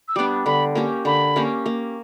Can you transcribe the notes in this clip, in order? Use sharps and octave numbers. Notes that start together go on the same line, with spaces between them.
E6
G3 B3 D4 D6
D3 B5
A#3 C#4 G4
D3 B5
A#3 C#4 G4
A#3